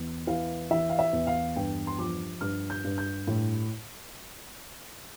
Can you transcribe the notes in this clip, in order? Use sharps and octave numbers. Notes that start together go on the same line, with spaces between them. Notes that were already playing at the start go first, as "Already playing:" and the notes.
Already playing: E2
E3 F5
E3 E5
F5
E5
E2
F5
G2 G5
C6
F3 D6
G2 F6
G6
G2
G6
A2